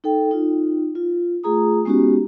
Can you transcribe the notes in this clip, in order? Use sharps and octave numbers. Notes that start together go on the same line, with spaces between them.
D#4 A4 G5
D#4 F4
F4
A3 F4 G#4 A#5 D#6
G#3 B3 C#4 D#4 F#4 G4